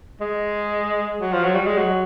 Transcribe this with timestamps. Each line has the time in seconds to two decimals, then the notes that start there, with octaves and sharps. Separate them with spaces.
0.20 G#3
1.21 F#3
1.32 F3
1.43 F#3
1.55 G3
1.66 G#3
1.77 F#3